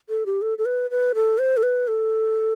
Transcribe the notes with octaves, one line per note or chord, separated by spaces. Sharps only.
A4
G4
A4
A4
B4
B4
A4
C5
A4
B4
A4